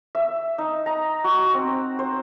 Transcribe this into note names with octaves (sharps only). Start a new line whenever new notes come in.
E5
D#4
A#5
F#4
C4
C5